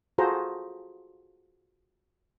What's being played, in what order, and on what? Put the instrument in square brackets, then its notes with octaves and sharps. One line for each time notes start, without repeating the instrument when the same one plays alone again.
[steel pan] F4 F#4 G#4 A4 C5 A#5